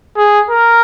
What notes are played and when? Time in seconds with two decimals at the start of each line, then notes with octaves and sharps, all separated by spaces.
0.17 G#4
0.50 A#4